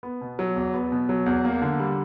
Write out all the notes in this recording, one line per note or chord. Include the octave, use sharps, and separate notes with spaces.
B3
B2
F#3
E2
B3
B2
F#3
E2
A#3
D3
G3